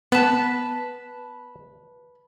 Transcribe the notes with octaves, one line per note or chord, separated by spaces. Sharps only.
B3 B4 A5